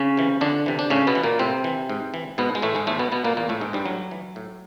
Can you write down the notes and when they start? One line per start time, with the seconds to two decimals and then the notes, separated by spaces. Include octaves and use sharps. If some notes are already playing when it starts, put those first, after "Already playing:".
Already playing: C#3 C#4
0.17 C3 E3
0.41 F2 D3 D4
0.66 C3 E3
0.79 D4
0.90 A2 C#3 C#4
1.07 B2 B3
1.15 E3
1.23 A#2 A#3
1.39 A2 C3 C4
1.64 E3
1.89 G#2
2.14 E3
2.38 G#2 B2 B3
2.55 G#3
2.62 A2 E3 A3
2.75 G#2 G#3
2.87 E2 A2 A3
2.99 B2 B3
3.12 B2 B3
3.24 A#2 A#3
3.37 E2 A#2 A#3
3.49 A2 A3
3.61 G#2 B2 G#3
3.73 G2 G3
3.86 A2 F#3
4.11 E3
4.36 A2